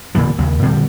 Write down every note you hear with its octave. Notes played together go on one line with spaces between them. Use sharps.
E1 A#2 D3 E3
D#2 C#3
A#2 D3 G3 C4